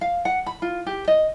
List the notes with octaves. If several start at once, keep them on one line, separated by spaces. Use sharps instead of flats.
F5
F#5
B5
F4
G4
D#5